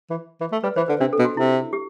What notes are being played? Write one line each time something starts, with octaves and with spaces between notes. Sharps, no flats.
E3
E3
A3
G3 B4
E3 C5
D3 B4
C3 D4
A4
B2
F#4
C3 E4
G4